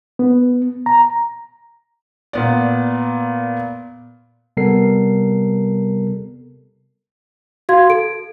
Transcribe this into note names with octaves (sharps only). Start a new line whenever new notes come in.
B3
A#5
A#2 B3 D5
C3 G3 B3 A4 A#4 C7
F#4 F5 C6 G#6
A4 D7